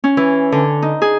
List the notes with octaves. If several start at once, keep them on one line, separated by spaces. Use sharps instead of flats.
C#4
E3
D3
D#4
G#4